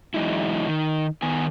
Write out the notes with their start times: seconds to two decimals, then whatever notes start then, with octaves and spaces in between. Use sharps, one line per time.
0.14 E2 F#3 G#3 D#4 E4
0.67 D#3
1.22 D#3 B3 G#5